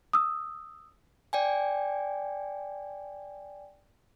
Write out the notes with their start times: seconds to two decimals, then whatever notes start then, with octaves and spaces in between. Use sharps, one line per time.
0.13 D#6 E6
1.33 D5 G5 G#5